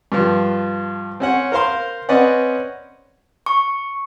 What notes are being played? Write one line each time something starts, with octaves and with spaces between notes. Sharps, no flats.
G2 F3
C4 C#4 F#5
A#4 C5 F5 C6
C4 C#4 B4 D5 D#5 F#5
C#6